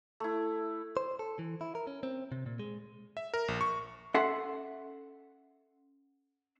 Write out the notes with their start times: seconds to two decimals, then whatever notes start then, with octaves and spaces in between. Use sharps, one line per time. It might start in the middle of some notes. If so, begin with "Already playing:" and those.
0.20 A3 E4
0.97 C5
1.19 A4
1.39 E3
1.61 E4
1.75 A#4
1.87 C#4
2.03 C4
2.32 C3
2.46 A#2
2.59 G#3
3.17 E5
3.34 A#4
3.48 A#1
3.61 C#6
4.14 C#4 A4 E5 F#5 C6